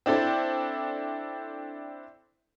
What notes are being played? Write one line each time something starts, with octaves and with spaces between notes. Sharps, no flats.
C4 D4 E4 A4 C5